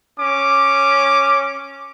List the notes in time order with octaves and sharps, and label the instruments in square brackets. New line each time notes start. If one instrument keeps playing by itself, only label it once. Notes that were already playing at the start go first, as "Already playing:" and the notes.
[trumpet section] C#4 D6